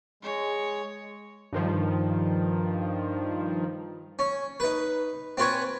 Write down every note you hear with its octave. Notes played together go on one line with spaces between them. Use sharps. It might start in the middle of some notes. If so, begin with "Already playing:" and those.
G#3 C#5
G2 D#3 F3
C#4
D#4 B4
C4 F4 B4 C#5 G#5 A#5